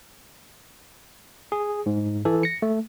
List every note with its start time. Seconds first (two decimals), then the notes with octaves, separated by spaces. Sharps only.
1.52 G#4
1.86 G#2
2.25 E3 A4
2.43 A#6 C#7
2.62 A3